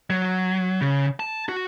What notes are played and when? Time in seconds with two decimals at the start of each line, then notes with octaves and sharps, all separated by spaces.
0.10 F#3
0.81 C#3
1.20 A5
1.49 F#4